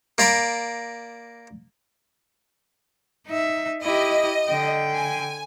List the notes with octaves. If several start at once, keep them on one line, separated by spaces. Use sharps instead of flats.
A#3 D5 A#5 B5
D#4 E5
E4 G4 D#5
D3 G5
G#5